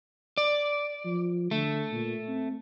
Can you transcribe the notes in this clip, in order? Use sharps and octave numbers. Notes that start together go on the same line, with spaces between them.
D5
F3
D3 A3
A#2
C4